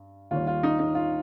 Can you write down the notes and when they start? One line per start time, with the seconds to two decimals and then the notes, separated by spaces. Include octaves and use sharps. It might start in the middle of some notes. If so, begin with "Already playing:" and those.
Already playing: G2
0.31 D#2 D#3 G3 F4
0.47 F4
0.63 D#4
0.79 D#4
0.95 F4